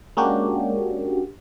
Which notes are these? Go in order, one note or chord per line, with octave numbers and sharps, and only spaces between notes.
G#3 A#3 C#4 D4 F#4 G4